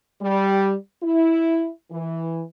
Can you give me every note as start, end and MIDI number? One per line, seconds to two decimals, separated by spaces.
0.21 0.74 55
1.03 1.68 64
1.91 2.43 52